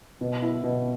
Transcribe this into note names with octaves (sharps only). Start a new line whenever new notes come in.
B2
E4
B2